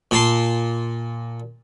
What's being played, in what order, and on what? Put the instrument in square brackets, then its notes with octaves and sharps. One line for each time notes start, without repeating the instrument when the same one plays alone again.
[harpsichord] A#2 A5 C6